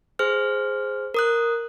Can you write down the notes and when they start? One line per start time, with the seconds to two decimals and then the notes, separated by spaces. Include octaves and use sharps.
0.19 G#4 C5 F6
1.14 A#4 D#6 F#6